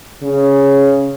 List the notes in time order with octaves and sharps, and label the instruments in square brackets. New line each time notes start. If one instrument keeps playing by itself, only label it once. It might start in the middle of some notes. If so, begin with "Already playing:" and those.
[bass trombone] C#3